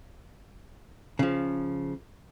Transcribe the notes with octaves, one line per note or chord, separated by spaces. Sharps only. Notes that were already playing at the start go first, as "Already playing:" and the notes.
C#3 F3